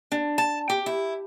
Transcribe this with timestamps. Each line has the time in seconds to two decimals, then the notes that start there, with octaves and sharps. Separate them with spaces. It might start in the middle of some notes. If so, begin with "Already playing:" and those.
0.12 D4
0.38 A5
0.70 G4
0.86 E4